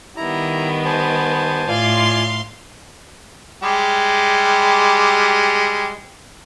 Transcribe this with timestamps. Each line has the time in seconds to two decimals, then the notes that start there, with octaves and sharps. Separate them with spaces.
0.17 D#3 G3 B3 E4 A#5
0.85 C5 G#5 A5
1.68 A2 F4 D5 F5 G#5 C6
3.63 G3 G#3 G4